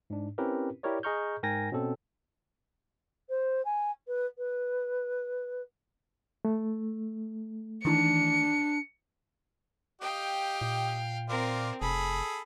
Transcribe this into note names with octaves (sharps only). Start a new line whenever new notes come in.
G#2 D4
C4 C#4 E4 G4 A#4 B4
E4 G4 A#4 C#5 D5
G#4 D#5 A#5 C#6 F6 G6
G#2 A#4 G5 G#5 A#6
B2 C4 C#4 A4
C5
G#5
B4
B4
A3
D#3 E3 D4 C#7
G4 D#5 F5 G5
A#2
C4 F4 A#4 D5
F1 G#4 A4 B5